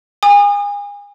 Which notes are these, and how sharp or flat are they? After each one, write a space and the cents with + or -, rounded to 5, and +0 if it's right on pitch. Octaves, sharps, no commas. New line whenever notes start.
G#5 -35 D#6 -35